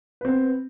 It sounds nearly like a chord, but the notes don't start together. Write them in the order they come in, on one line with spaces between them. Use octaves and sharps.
B4 C4 B3